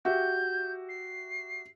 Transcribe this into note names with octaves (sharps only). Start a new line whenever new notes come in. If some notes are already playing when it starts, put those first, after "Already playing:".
F#4 G4 E5 G6
C7